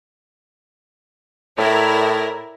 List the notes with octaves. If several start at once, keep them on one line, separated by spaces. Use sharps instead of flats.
A2 E4 A#4 D5